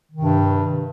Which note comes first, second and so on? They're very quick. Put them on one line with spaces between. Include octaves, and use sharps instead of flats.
D#3 C3 G2